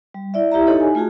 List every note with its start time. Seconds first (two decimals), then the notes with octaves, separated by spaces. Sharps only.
0.14 G3
0.34 E4 D5 E5
0.52 E4 G4 E5 A#5
0.67 D#4 G4 A4 C#5 D#5
0.80 G#5
0.95 A3 F4 F#4 G#4 A5